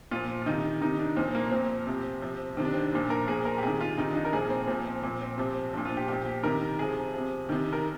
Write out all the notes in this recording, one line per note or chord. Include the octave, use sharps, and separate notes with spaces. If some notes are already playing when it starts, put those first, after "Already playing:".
A#2 F3 F4
F4
C3 D#3 D#4
C3 D#3 D#4
D4
A#2 F3 C4
C4
A#3
A#2 F3 C4
C3 F3
C3 F3
C3 D#3 C4
D4
C4
A#2 F3 D4
A#4
A#2 F3 G#4
A#4
G4
C3 D#3 G#4
F4
C3 D#3 D#4
D4
D#4
A#4
A#2 F3 G#4
C4
A#2 F3 C4
C4
A#2 F3 C4
C4
C3 F3
A#2 F3 D4
F4
G4
A#2 F3 G4
G4
C3 D#3 A#4
C3 F3 G#4
C3 F3
C3 D#3
A#4